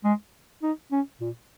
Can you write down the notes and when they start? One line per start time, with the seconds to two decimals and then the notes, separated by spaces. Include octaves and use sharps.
0.04 G#3
0.63 D#4
0.92 C#4
1.21 A#2